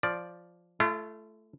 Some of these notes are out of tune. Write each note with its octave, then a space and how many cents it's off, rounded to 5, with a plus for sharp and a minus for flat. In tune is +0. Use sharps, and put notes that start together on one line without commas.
F3 +0 D5 +0
A3 -10 F4 -45